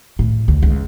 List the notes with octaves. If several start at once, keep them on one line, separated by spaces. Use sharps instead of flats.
A2
D2
C#2